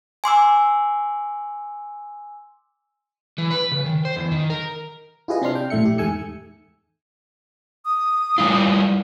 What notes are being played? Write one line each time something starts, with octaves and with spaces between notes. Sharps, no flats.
G#5 C6 D6 E6
E3
B4
C#3
D#3
C5
E2
D#3
A#4
E4 F4 G4 G#4 B4 D#5
C3 C4 D4 C6 F6
G5
A#1 A2 A3 E5 C#7
G4
E2 G#2 A3 G#5 E6 C#7
D#6
G3 E4 F4